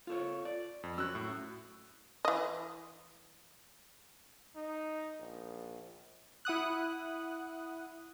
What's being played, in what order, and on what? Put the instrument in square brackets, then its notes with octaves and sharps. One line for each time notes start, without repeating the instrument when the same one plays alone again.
[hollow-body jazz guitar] F4 A4 C#5
D5
[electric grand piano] F2
[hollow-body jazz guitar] C#4 F#4 [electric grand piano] E6 F#6
[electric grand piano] A2
[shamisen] E3 D#5
[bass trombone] D#4
A#1
[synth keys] E4 F#5 D#6 F#6